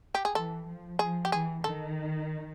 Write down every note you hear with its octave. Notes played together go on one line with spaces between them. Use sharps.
G4
G#4
E3 A4
F3
F3 G#4
G4
E3 G#4
D#3 A4